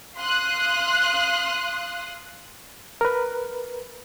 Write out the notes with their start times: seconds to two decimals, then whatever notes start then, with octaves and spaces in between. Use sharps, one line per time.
0.17 F5 C6 D#6 F#6
3.01 A#4 B4